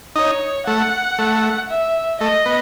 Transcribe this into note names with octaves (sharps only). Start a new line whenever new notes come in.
D#4 C#5
A3 F#5
A3
E5
A3 D#5
B3